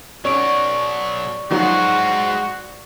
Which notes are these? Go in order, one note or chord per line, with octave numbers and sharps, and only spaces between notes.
B2 F#3 C#4 D5 C#6 D7
D#3 F3 F#3 G#3 F#4 C5